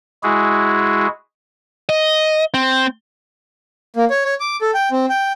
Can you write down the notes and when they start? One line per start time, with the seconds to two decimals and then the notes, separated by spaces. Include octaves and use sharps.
0.23 G#3 E4 F#4 G#4
1.89 D#5
2.54 C4
3.96 A#3
4.10 C#5
4.25 C#5
4.40 D6
4.61 A4
4.74 G5
4.92 C4
5.10 G5